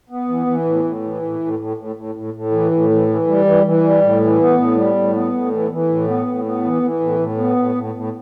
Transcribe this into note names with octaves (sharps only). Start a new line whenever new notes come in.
B3
E3
E3
A2
A2
E3
A2
A2
A2
A2
A2
A2
A2
E3
A2
E3
E3
G3
E3
E3
G3
A2
E3
B3
A2
G3
A2
B3
A2
E3
E3
A2
B3
A2
B3
E3
E3
A2
A2
B3
A2
A2
A2